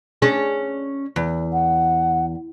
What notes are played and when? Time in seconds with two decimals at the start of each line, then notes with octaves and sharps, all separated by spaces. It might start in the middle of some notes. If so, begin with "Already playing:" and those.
0.22 C#4 D4 G#4
1.16 E2
1.53 F#5